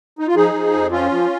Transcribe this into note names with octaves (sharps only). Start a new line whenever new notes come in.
D#4
F4
F3 D#4 G#4
F3
F2
F3 C#4 F4
F3